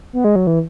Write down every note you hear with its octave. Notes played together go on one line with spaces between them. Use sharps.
B3
G#3
F#3
E3